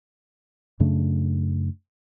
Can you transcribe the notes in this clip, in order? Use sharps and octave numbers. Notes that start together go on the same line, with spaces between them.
F#2 C#3 A3 D4